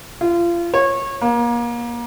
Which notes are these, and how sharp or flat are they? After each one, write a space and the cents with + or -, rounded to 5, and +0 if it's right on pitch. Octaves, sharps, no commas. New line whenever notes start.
F4 -30
C#5 -25
A#3 +30